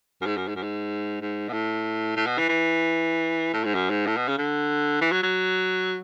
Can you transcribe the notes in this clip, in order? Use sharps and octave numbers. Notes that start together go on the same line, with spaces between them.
F#2
G#2
F#2
G#2
F#2
G#2
G#2
B2
A2
A2
B2
E3
E3
A2
G#2
F#2
G#2
A2
B2
C#3
D3
E3
F#3
F#3